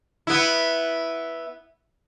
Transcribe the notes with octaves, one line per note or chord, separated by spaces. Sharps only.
B3 E4